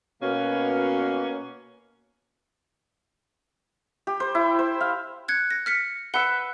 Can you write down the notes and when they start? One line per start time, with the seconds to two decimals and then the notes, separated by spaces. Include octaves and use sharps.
0.21 B2 A#3 C#4
4.07 G4
4.20 C5
4.35 E4
4.59 C5
4.81 F5
5.28 F#6 G#6 C#7
5.50 A#6
5.66 F6 B6 C#7
6.14 B4 E5 F#5 C#7 G7